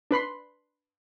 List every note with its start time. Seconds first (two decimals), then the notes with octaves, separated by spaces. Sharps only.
0.11 D4 B4 B5 C6